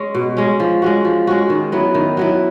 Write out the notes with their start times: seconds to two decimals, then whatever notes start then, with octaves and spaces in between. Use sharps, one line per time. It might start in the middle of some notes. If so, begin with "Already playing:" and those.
Already playing: G#3 C#4
0.15 B2
0.37 G#3 C#4
0.60 F3
0.82 G#3 C#4 F#4
1.05 F3
1.27 G#3 C#4 F#4
1.50 D#3
1.72 F#3 B3 E4
1.95 D#3
2.17 F#3 B3 E4